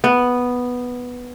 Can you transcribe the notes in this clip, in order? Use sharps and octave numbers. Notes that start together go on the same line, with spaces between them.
B3